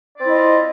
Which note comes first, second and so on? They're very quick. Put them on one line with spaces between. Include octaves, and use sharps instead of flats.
D5 C4 E4 D#5 F4